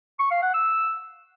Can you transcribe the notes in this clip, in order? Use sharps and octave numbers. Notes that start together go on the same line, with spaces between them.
C#6
F5
F#5
E6